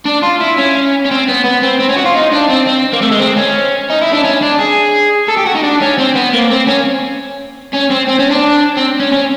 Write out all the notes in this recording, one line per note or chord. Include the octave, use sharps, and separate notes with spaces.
D4
F4
E4
C#4
C#4
C4
B3
B3
C4
C4
C#4
F#4
F4
D#4
D4
C4
C4
A#3
A3
G#3
C4
C#4
D#4
E4
D4
C#4
D4
G#4
A4
G4
F#4
D#4
D4
C#4
C4
B3
A#3
C4
C#4
C#4
C4
C4
C#4
D4
C4
C#4
C#4